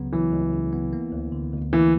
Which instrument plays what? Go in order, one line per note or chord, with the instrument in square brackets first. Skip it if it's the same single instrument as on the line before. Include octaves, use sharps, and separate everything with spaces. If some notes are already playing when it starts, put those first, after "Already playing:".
Already playing: [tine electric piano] C#2 C#3 F#3 B3
[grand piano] E3 [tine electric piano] F#3
[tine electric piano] C#2
C#3
B3
A#3
D2
D3
D2
[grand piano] E3 [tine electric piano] A#3